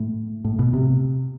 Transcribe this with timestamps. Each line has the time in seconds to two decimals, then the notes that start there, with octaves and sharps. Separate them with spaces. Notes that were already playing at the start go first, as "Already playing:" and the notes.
Already playing: A2
0.45 A2
0.59 B2
0.73 C3